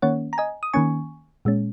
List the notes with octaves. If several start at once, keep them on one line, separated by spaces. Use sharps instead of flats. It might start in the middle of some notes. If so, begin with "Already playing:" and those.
D#3 A#3 C#4 C#5 F#5
A#5
D#5 G#5
D#6
D#3 A#3 C#4 G#5 C#6
A#2 G#3 C#4